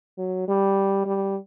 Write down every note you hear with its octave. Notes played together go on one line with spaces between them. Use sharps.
F#3
G3
G3